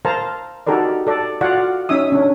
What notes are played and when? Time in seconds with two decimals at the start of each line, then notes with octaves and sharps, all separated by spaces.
0.05 A#4 C5 F5 A5 A#5
0.67 D#4 F#4 G4 A4 A#4 D5
1.07 A4 D5
1.41 F4 F#4 D5 F5 F#5
1.89 C#4 D#4 E5 D#6
2.12 C#4 D4